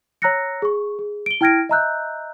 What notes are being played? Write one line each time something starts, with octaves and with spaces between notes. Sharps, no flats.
C#5 A#5 E6 F#6 A#6 C#7
G#4 C#6
G#4
D7 G7
E4 G5 F6 G#6 A#6 D7
D#5 E5 A#5 E6 F#6 G6